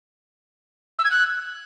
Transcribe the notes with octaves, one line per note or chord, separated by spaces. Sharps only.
E6
G#6
F#6